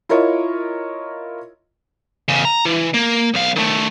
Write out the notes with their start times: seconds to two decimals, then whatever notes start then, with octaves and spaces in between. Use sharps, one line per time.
0.09 E4 F4 A#4 C#5 D#5
2.28 E2 C#3
2.45 A#5
2.66 E3
2.94 A#3
3.34 B1 F5
3.56 D#3 A3